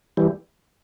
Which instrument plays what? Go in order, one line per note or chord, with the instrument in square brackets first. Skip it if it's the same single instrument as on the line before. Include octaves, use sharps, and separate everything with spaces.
[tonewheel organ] E3 G3